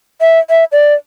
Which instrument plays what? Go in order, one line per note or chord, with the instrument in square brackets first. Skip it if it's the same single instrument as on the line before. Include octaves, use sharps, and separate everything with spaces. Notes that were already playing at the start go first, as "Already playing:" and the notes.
[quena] E5
E5
D5